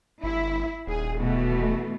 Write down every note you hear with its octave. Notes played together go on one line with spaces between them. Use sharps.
G1 E4
D#1 G#4
B2 E3 A3